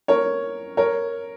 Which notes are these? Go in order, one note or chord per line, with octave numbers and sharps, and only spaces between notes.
A#4 C#5
A#4 C#5